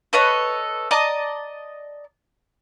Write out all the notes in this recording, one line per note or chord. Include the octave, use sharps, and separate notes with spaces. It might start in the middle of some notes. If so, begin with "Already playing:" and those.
A4 B4 C#5 D#5
D5 D#5 A5 A#5